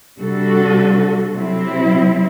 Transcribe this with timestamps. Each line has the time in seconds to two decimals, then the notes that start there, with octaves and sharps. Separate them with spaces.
0.19 C3 G3 D4 F#4 A4
1.33 C3 F#3 C4 E4